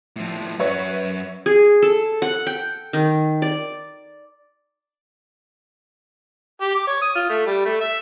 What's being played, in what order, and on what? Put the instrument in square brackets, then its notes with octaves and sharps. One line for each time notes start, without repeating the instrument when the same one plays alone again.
[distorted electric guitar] A2 F3
[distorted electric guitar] F#2 F#4 [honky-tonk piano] B4 C#5 E5
[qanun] G#4
A4
F#5
G5
D#3
D5
[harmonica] G4
D6
C#5
D#6
F4
A3
G3
A3
E5